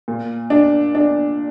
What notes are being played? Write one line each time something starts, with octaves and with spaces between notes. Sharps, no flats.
A#2
D4
D4